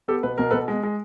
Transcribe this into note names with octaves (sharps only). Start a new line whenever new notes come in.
B3 G4 A4
B2 B4
B2 A#4
B2 A4 B4
G#3
G#3